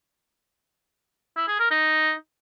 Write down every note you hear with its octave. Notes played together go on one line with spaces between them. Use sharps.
E4
G#4
A#4
D#4